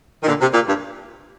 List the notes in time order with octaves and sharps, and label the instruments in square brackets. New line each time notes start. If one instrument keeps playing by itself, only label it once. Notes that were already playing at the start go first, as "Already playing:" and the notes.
[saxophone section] D#3
A#2 D3
C3
A#2
G2